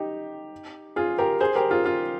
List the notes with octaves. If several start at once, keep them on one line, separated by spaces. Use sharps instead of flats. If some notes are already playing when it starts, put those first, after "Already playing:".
Already playing: D#4 G4
F4 G#4
G4 A#4
G#4 C5
G4 A#4
F4 G#4
F4